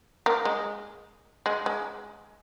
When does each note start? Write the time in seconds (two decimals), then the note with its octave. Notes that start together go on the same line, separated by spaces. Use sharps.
0.26 A#3
0.45 G#3
1.46 G#3
1.66 G#3